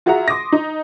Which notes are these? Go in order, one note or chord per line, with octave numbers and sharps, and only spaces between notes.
F4 F#4 G#4 E5 F#5 A#5
C6 D6 D#6 A#6
D#4